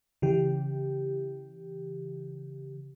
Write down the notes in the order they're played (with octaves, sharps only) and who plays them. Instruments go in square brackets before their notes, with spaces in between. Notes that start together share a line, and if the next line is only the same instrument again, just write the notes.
[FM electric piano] C#3 E3 G4